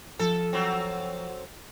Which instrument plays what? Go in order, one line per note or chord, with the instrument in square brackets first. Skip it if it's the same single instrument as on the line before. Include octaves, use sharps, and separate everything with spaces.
[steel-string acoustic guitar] F3 [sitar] A4
[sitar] F#3 C4